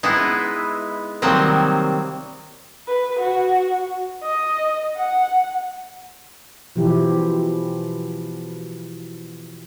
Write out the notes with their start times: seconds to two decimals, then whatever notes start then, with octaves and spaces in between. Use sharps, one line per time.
0.03 G#3 B3 D#4 E4
1.22 C3 D#3 F#3 G3 A#3 C4
2.87 B4
3.19 F#4
4.23 D#5
4.96 F#5
6.76 B2 E3 F3 E4 G4